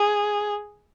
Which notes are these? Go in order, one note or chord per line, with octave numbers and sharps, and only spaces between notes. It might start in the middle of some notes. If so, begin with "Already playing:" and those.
Already playing: G#4